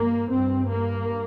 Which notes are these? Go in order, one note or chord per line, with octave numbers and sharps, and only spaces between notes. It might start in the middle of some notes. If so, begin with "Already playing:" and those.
Already playing: G2 A#3
G2 C4
A#3